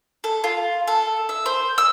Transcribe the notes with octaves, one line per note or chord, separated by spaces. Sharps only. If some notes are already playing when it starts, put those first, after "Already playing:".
A4
F4
A4
E5
C5
E6